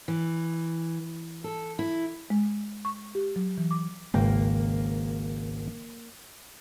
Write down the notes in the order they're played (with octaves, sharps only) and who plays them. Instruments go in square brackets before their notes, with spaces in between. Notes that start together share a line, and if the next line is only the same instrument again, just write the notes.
[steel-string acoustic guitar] E3
A4
E4
[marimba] G#3
C#6
G4
F#3
E3
D6
[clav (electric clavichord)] G#1 C#2 G5 [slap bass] A#3